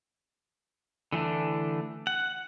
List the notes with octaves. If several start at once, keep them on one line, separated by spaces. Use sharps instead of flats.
D3 E3 A3 D4
F#5